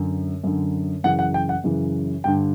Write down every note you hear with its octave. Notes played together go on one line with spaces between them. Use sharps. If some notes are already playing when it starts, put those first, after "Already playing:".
Already playing: F#2 D3
F#2 D3
F#2 C#3 E3 F#5
F#5
G5
F#5
F#2 C#3 E3
G2 D3 G5